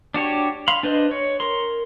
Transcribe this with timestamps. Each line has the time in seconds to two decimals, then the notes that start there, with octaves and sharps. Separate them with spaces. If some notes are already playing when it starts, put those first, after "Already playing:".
0.14 D4 F#4 G4 C#5
0.68 F5 B5 C6
0.83 D4 B4 C5 D#5
1.11 C#5
1.40 A#4 C6